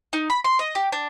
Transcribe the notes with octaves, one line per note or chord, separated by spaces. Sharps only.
D#4
B5
C6
D#5
G4
D4